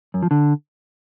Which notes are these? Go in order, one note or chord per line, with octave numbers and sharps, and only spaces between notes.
F#2
F3
D3